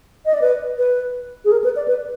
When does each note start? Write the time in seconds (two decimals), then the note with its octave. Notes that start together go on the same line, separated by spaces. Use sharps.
0.26 D#5
0.34 D5
0.42 B4
0.78 B4
1.45 G#4
1.52 A#4
1.64 B4
1.76 D5
1.88 B4